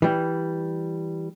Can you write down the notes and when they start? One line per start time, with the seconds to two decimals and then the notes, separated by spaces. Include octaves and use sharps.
0.02 E3 G3